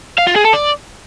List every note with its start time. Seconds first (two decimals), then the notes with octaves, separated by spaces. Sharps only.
0.18 F5
0.27 F4
0.36 G#4
0.44 A4
0.53 D5